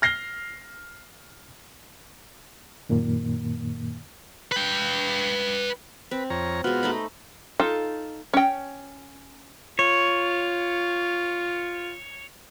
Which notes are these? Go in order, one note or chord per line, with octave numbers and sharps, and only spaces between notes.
F6 A#6 C7 G7
F#2 A#2 D#3 A#3
B4 G5
C4 B4
F2 C#5 A#5
B2 G#3 B3 F4 F#5
A3 D#4 B5
D#4 F4 A4
C#4 G5
F4 C#5